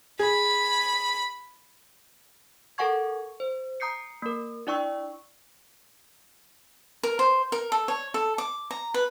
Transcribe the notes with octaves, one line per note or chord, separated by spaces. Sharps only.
G#4 B5
A4 A#4 F#5 G#5 C#6 G#6
C5
A#5 D#6 G6 C7 C#7
A#3 A#4
D4 E4 D5 G5 C#6 E6
A#4
C5
A#4
A4
C#5
A4
D6
A#5
B4